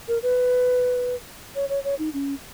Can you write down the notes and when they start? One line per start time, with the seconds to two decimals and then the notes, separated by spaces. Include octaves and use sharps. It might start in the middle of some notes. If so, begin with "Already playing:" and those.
0.08 A#4
0.23 B4
1.55 C#5
1.69 C#5
1.84 C#5
1.99 D#4
2.14 C#4